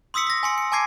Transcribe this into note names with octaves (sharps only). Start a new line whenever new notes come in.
C6 D#6 E6 B6 C#7
A#6 B6
G#5 C6 C#7
C#7
G#5 A5 D6 G#6 C7